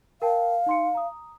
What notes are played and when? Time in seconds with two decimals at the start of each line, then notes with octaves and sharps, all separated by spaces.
0.22 A#4 F5 G5 A5
0.66 D#4 C6 C#7
0.95 A#5 D#6